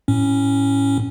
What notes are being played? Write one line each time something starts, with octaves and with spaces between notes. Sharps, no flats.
A2 C#4